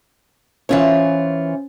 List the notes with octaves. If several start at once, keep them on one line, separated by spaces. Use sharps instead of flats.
E3 C#4 F4 C5 C#5